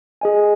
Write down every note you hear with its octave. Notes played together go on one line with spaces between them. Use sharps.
G#4 D#5 G#5